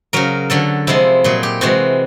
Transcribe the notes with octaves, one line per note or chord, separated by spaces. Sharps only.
C#3 F#3 A#4
D3 F#3 A4
C3 F3 G#3 E4
A#2 F#3 G#4
G4
C3 E3 G#3 F#4